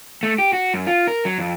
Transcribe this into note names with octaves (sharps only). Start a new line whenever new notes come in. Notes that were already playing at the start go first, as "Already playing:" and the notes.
A3
G4
F#4
F#2
F4
A#4
F#3
F2